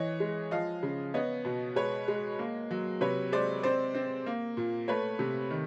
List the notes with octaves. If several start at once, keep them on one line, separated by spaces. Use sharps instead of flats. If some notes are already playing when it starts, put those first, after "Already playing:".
Already playing: E3 C#5 D#5
G#3
F3 D#5 F5
C#3
B3 C#5 D#5
B2
G#3 B4 C#5
G#3
A#3
F#3
C3 B4 C#5
G#3 C5 D5
C4 C5 D5
C4
A#3
A#2
A3 B4 C#5
C3
D#3